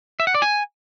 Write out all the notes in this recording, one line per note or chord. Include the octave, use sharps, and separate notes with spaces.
E5
F#5
D5
G#5